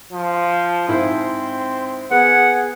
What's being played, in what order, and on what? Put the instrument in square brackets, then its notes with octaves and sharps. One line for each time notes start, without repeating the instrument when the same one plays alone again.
[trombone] F3
[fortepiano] G#2 E4 C5 [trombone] C4 [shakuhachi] C6
[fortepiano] B3 [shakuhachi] G#4 [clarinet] F#5